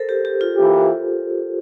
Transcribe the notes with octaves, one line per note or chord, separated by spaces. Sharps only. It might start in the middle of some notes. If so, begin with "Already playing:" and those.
Already playing: A4 A#4 C5
G4
G4
F4
E3 A#3 E4 G4